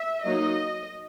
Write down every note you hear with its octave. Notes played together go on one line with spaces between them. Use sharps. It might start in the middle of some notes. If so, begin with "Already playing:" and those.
Already playing: E5
F#3 A#3 D#4 D#5